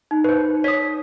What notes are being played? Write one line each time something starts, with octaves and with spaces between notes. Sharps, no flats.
D#4
B4 C5
C#5 D#6 B6